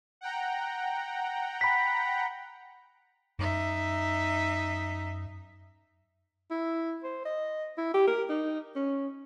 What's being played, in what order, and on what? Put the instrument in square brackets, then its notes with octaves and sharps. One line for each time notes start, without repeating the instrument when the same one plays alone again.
[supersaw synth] F#5 G5 A#5
[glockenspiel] B5 B6
[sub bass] F#2 [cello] D#4 E5
[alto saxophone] E4
C5
D#5
E4
G4
A#4
D#4
C#4